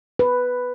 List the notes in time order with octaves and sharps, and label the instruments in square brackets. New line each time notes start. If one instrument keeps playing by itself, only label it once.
[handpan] B4